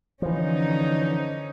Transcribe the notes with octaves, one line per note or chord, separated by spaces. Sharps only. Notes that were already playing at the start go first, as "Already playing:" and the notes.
D3 E3 F3 C#4 D#4